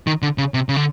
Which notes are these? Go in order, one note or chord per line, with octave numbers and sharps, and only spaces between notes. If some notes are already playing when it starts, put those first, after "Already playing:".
D#3
D3
C#3
C3
C#3
D3